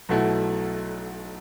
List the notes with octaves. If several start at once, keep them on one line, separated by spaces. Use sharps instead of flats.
B1 B2 F#3 A3 E4